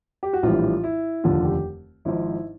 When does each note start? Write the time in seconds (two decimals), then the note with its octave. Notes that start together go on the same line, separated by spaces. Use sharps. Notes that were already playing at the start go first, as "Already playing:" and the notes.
0.23 G4
0.33 F#4
0.43 A#1 A2 E3 G3 F4
0.84 E4
1.24 F1 D#2 D3 F3 F4
1.44 G4
2.05 G#1 G#2 F3 E4